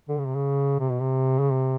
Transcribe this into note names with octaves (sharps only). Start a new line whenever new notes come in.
D3
C#3
C3
C#3
C3
B2
C3
C#3
C3